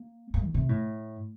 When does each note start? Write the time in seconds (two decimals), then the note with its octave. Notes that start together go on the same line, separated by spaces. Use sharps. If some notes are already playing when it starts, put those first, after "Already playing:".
Already playing: A#3
0.34 A#3
0.44 D#3
0.54 C3
0.69 A2